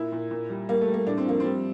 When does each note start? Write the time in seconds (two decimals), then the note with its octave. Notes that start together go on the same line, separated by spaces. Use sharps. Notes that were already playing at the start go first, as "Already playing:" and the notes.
Already playing: A#2 E4
0.12 A#2
0.31 A#2
0.50 G3
0.69 G3 A#3
0.81 A3
0.88 G3
0.94 A#3
1.07 A2 D4
1.18 C4
1.26 F3 A#3
1.40 G3 C4